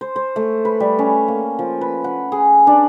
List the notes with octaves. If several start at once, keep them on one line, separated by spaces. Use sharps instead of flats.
C5
C5
A3
B4
G3
C#4
A#3
F3
B4
F#5
G#4
D4